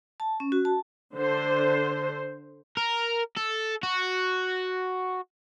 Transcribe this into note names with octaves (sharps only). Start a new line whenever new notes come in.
A5
C#4
F#4
A5
D3 C5
A#4
A4
F#4